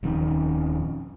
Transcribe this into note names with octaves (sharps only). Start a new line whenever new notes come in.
D#1 F2 D#3 C#4